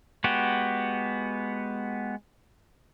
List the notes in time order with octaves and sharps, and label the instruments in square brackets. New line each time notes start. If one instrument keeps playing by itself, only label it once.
[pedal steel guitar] G#3 B3 F#4 G4